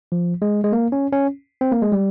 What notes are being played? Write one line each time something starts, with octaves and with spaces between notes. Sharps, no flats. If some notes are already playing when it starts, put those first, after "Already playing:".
F3
G#3
G#3
A#3
C#4
C#4
C4
A#3
G#3
G3